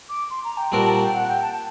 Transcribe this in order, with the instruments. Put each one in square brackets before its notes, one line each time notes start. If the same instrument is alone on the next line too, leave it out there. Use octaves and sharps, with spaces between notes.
[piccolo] D6
C6
A#5
G5
[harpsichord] A#2 G3 C4 F#4 A#4 [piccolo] A5
[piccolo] A5
G5
F#5
G5
A5